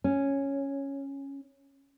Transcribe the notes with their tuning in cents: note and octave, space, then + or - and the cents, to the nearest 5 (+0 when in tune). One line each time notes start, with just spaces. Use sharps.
C#4 -5